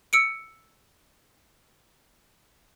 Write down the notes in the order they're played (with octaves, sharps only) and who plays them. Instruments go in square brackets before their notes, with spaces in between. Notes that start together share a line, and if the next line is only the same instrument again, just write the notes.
[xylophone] E6 C#7 D7